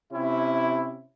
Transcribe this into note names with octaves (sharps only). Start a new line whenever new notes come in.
C3 C#4 E4